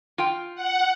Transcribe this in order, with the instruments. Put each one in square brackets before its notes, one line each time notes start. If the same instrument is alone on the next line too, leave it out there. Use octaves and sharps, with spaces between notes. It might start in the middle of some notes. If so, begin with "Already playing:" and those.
[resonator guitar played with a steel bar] F4 G5
[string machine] F#5